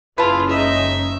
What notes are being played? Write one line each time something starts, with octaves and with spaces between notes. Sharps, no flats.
F#1 C#4 E4 F4 G#4 B4 A5
G#3 D#4 D#5 E5